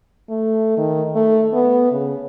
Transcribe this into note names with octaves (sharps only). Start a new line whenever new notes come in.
A3
D#3
A3
B3
C#3